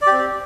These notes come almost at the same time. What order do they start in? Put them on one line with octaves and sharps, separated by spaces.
D5 G4 C4